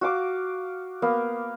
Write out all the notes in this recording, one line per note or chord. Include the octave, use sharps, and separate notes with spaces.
F#4 F5 D6
A#3 B3 F5